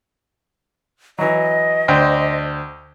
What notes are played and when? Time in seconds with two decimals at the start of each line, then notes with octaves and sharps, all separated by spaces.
1.19 E3 F#3 D#5
1.88 D2 C5 G5